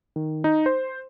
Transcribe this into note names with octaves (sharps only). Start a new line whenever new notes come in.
D#3
D#4
C5